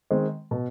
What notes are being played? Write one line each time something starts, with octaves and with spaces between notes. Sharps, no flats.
D#3 G#3 C4
B2